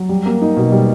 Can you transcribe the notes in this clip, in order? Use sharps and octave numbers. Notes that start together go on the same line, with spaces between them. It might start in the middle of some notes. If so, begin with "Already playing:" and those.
Already playing: F#3
G3
A#3
D#4
B2
G3